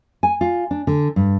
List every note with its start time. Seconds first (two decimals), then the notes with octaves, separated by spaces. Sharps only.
0.23 G#5
0.41 F4
0.71 D4
0.87 D3
1.16 G2